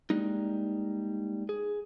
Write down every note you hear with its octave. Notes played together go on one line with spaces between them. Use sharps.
G3 G#3 A#3 D#4
G#4